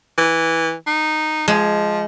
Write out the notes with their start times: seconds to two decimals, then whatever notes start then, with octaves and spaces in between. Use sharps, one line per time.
0.18 E3
0.87 D#4
1.48 F3 G#3